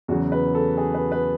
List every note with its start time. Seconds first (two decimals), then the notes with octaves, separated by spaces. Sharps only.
0.08 E2 C#3 F#3 F#4
0.32 B4
0.55 A4
0.77 G#4
0.94 B4
1.12 B4